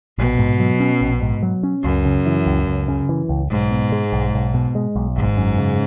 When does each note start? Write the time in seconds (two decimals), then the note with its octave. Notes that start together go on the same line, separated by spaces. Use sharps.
0.18 A#1 B2
0.38 G#2
0.59 F#3
0.80 C#4
1.01 A#1
1.22 G#2
1.43 F#3
1.63 C#4
1.84 C#2 F#2
2.05 C#3
2.26 E3
2.46 C#2
2.67 C#2
2.88 C#3
3.09 E3
3.29 C#2
3.50 B1 G#2
3.71 B2
3.92 G#3
4.12 B1
4.34 B1
4.54 B2
4.75 G#3
4.96 B1
5.16 G#1 G#2
5.37 F#2
5.58 C#3